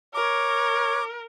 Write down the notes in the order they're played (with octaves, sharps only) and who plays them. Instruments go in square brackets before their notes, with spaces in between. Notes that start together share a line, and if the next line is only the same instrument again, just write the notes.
[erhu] A#4 [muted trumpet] C#5 [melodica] D6